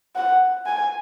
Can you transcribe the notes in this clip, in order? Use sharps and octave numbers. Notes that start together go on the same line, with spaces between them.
F#5
G#5